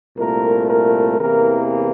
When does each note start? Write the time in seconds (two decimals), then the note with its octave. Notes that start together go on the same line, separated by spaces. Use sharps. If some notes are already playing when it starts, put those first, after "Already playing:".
0.18 C2 A#2 A3 A#4
0.69 A#4
1.20 E2 C3 E3 A#3 A#4